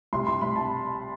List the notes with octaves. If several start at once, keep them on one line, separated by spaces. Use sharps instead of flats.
C2 C6
C6
C2 B5
A5